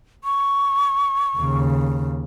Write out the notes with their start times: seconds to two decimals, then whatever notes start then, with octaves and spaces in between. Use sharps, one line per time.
0.24 C#6
1.37 D#2 C#3